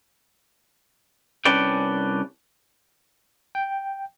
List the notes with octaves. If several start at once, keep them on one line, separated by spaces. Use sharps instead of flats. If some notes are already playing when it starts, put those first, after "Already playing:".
C2 C#4 D4 B4 D5 G5
G5